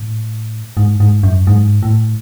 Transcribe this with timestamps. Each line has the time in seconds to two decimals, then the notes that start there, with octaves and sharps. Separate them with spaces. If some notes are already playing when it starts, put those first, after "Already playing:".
Already playing: A2
0.77 G#2
1.00 G#2
1.23 F#2
1.47 G#2
1.83 A2